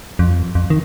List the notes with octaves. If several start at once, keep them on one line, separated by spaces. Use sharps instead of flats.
F2
F2
D#3